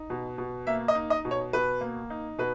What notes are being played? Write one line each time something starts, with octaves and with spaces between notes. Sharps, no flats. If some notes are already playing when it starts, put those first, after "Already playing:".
Already playing: D#4
B2
B2
A#3 E5
D#5
D#4
D#5
B2
C#5
B2 B4
A#3
D#4
B2 B4